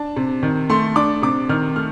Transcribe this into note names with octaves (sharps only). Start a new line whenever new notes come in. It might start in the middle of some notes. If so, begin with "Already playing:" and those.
Already playing: D4 A5
C3
D#3
A3 C6
D4 D6
C3 D6
D#3 F6
A3 F6